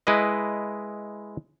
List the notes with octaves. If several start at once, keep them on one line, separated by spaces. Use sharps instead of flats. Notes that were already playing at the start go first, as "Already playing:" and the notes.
G#3 E4 B4 D#5